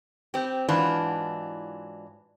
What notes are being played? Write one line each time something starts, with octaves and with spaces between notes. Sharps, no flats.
C4 G4
G#2 E3 F#3 D4 F4